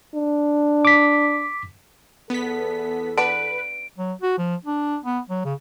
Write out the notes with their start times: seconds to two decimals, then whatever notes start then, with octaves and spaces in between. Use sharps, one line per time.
0.15 D4
0.85 D6 B6
2.30 E2 B3 A4 B6
3.18 B3 D4 B4 D7
3.98 F#3
4.22 F#4
4.38 F3
4.65 D4
5.04 B3
5.29 F#3
5.45 C#3